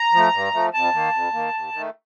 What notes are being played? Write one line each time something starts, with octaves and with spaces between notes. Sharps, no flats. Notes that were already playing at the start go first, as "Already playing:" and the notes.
Already playing: A#5
F3 A3
G2
F3 A3
F2 A5
D#3 A#3
F2
D#3 A#3
D#2
D#3
A3